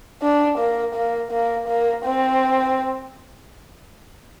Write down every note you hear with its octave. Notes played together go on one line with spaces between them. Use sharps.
D4
A#3
A#3
A#3
A#3
C4